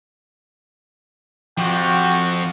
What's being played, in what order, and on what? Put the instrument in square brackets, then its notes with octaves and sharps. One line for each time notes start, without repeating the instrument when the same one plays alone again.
[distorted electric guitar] F2 F3 [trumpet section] F#4 G4 G5